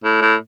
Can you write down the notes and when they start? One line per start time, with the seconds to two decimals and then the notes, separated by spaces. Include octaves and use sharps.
0.04 A2
0.22 A2